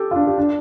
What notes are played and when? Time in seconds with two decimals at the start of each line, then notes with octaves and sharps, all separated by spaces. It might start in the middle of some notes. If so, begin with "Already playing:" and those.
Already playing: G4 A4
0.11 F4
0.16 D4
0.27 G4
0.38 D4